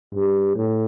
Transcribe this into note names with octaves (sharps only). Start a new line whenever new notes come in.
G2
A2